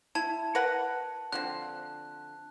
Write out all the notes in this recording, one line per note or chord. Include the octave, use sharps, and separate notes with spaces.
E4 A5
A#4 B4 F#5
D3 F3 C4 F#6